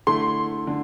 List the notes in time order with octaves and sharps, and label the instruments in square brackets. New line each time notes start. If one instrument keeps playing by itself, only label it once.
[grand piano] D3 A3 E4 [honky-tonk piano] C6
[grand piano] D3